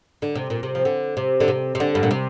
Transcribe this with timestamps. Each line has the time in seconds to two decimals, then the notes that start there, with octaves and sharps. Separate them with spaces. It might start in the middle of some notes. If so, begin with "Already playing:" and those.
0.22 D3
0.35 C3
0.50 A#2
0.63 C3
0.75 F3
0.85 D3
1.17 C3
1.40 D3
1.48 C3
1.75 C3
1.80 D3
1.95 G2
2.03 A#2
2.11 C3